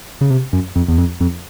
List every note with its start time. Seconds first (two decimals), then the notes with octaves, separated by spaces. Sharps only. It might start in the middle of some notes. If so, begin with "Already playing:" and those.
0.21 C#3
0.30 C3
0.53 F#2
0.76 F2
0.88 E2
0.98 F2
1.20 F2